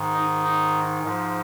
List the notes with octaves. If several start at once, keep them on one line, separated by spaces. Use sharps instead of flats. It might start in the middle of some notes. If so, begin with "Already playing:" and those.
Already playing: G#2 D#3
D#4
D#4
G#2 F3